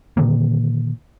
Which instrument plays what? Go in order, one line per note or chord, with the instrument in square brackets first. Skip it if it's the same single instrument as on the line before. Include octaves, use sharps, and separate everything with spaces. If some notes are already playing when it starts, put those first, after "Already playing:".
[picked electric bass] A#2 D3 D#3 A#3